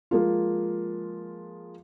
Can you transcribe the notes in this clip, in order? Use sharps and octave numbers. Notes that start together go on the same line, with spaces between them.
F3 G#3 A#3 F4